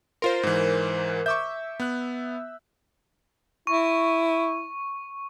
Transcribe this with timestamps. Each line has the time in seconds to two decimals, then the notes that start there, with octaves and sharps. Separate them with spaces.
0.22 F4 A#4 C5 C6
0.43 G#2 E3
1.26 E5 C#6 D6 E6 G6
1.80 B3 F#6
3.67 E4 C#6